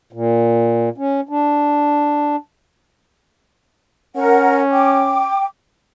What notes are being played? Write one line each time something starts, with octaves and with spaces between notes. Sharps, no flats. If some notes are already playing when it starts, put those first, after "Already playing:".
A#2
C#4
D4
C#4 A#4 F#5
G5 D6